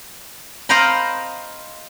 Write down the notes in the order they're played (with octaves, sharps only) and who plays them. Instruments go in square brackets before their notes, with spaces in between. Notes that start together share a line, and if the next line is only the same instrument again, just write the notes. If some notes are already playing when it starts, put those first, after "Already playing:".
[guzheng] C5 D#5 F5 G5 A#5 B5